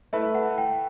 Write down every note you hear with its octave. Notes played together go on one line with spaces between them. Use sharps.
A3 E4 B4 E5
F#5
G5